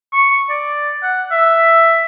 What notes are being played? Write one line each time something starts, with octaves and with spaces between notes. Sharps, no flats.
C#6
D5
F#5
E5